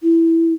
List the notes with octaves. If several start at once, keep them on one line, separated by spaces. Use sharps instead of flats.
E4